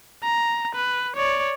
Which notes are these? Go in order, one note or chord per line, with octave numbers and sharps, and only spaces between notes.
A#5
B4
C#5 D5